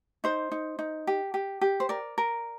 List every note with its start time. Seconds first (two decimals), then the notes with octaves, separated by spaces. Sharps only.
0.24 D#4 C5
0.52 D#4
0.79 D#4
1.07 G4
1.34 G4
1.61 G4
1.80 C5
1.89 A#4 D5
2.18 A#4